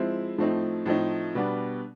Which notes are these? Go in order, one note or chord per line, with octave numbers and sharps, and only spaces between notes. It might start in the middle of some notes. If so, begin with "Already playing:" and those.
Already playing: F3 G#3 C4 E4
A2 F3 A3 C4 D#4
A2 F3 A3 C4 D#4
B2 G3 B3 D4